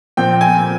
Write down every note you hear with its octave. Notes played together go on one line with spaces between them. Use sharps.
A#2 F3 C4 G5
G#5